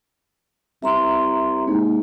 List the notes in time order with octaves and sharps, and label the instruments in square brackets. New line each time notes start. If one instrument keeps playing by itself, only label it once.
[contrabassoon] C2 [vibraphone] E5 A#5 C6
[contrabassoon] G#2 [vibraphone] A#3